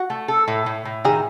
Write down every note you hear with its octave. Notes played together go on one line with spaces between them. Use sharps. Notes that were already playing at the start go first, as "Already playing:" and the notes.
Already playing: F#4
A3
A4
A2
A2
A2
D#3 G#4